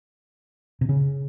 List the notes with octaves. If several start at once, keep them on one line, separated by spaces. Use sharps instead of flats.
C3
C#3